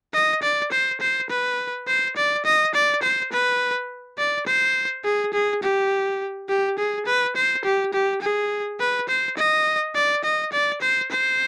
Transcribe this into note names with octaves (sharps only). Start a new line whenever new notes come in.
D#5
D5
C5
C5
B4
C5
D5
D#5
D5
C5
B4
D5
C5
G#4
G#4
G4
G4
G#4
B4
C5
G4
G4
G#4
B4
C5
D#5
D5
D#5
D5
C5
C5